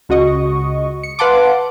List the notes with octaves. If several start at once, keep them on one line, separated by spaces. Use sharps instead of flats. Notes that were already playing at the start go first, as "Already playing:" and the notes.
C#2 F#4 D#5 C#6
C#7
B4 F5 F#5 A5 C6 D6